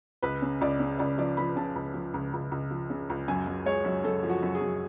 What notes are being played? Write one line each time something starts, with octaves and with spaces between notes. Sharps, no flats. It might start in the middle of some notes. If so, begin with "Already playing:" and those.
C#2 B4
C#3
C#2 D5
C#3
C#2 D5
F3 D5
F3 B5
C#3 A5
C#2
F3
C#2
C#2
C#2
F3
C#3
C#2
F#2 G#5
F#2
G#3 C#5
F#2
F#2 A4
F3
F#4
F#2
G#4
F#2